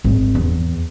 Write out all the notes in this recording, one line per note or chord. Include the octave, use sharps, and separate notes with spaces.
G#1
E2